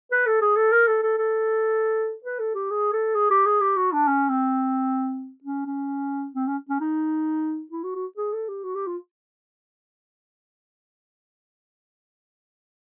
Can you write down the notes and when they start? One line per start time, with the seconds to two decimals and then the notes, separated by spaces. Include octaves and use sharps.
0.11 B4
0.26 A4
0.41 G#4
0.56 A4
0.72 A#4
0.87 A4
1.03 A4
1.17 A4
2.24 B4
2.39 A4
2.55 G4
2.70 G#4
2.92 A4
3.15 G#4
3.30 G4
3.45 G#4
3.61 G4
3.76 F#4
3.92 D4
4.07 C#4
4.29 C4
5.44 C#4
5.66 C#4
6.34 C4
6.47 C#4
6.69 C#4
6.80 D#4
7.71 E4
7.83 F#4
7.95 F#4
8.17 G#4
8.33 A4
8.48 G4
8.64 F#4
8.75 G4
8.87 F4